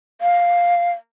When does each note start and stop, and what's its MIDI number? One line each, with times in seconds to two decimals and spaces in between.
0.21 0.91 77